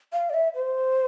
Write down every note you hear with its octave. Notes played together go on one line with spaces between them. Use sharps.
F5
D5
E5
C5